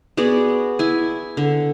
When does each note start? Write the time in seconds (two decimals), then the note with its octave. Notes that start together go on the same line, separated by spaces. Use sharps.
0.17 B3 F#4 G#4 D5
0.79 E4 G#5
1.37 D3